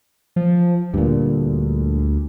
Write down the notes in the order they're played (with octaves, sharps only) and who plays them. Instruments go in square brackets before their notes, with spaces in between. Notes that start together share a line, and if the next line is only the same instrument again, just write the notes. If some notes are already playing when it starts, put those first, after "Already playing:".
[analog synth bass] F3
[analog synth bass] D2 [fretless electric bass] G2 A#2